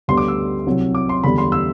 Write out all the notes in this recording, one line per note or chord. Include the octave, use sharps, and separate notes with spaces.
D2 D3 G3 B3 C6
D6
E6
C2 C3 F#3
D6
C6
E2 D3 G3 B5
C6
E6